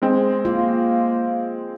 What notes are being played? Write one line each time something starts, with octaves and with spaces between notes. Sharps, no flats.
G#3 C4
A#3 F4